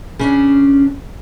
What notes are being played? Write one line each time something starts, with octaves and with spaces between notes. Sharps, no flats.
C#3 C#4 D4